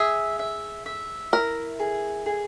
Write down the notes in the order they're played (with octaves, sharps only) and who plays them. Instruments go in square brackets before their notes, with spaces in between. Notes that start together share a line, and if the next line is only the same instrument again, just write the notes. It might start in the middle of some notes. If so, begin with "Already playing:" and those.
Already playing: [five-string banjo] G#4 [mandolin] E5
[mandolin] E5
E5
[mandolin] E4 [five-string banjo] A#4
[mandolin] G#4
G#4